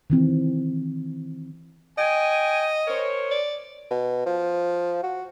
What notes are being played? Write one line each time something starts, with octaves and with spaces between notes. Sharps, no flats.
D#3 E3 C4
D#5 G5 G#5
A#4 C5 C#5
D5
B2
F3
F#4